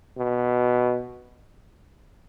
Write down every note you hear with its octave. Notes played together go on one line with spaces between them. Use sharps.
B2